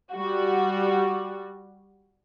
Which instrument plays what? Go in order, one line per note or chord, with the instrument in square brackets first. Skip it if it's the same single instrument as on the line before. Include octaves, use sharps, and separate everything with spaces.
[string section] G3 F#4